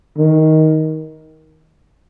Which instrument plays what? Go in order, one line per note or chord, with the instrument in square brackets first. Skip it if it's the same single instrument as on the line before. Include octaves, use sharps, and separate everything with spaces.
[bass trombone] D#3